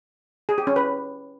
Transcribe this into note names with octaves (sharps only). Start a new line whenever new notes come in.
G#4
G4
C#4
B4